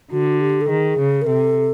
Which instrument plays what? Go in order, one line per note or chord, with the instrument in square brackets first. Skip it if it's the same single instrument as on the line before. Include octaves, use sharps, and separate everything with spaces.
[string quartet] D3 [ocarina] F#4
[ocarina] G4
A4
[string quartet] D#3 [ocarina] G#4
[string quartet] C#3
[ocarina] A#4
[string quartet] C3 [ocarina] A4